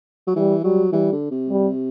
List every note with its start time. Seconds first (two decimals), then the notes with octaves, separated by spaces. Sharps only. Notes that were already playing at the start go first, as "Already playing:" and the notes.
0.27 F#3
0.36 E3 G3
0.64 F#3 G3
0.92 E3 G3
1.12 D3
1.31 C3
1.49 G3